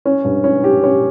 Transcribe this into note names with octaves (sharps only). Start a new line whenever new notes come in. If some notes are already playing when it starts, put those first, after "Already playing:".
C#4
G2
C#4
G4
C#4